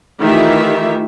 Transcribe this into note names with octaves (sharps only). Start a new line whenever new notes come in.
D#3 E3 A3 F4 G4 E5